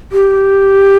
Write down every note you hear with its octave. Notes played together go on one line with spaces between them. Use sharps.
G4